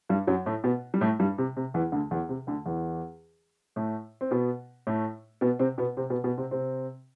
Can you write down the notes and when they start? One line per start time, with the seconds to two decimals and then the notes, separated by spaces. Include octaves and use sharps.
0.09 G2 G3
0.27 F#2 F#3
0.46 A2 A3
0.64 B2 B3
0.94 G3
1.01 A2 A3
1.19 G2 G3
1.38 C3
1.57 C3
1.74 E2 E3
1.92 D2 D3
2.11 E2 E3
2.29 C3
2.47 D2 D3
2.66 E2 E3
3.76 A2 A3
4.21 C4
4.31 B2 B3
4.87 A2 A3
5.41 B2 B3
5.59 C3 C4
5.78 B2 B3
5.97 C3 C4
6.10 B2 B3
6.24 B2 B3
6.38 C3 C4
6.51 C3 C4